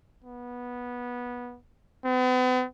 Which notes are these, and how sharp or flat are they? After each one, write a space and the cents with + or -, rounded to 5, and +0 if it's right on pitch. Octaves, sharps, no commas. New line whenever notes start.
B3 -15
B3 +45